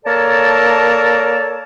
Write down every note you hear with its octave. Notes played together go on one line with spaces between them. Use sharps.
A#3 A4 A#4 C#5 D5 A5